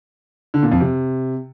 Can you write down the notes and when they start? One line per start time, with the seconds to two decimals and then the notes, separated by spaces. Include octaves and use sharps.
0.54 D3
0.63 A#2
0.72 F2
0.80 C3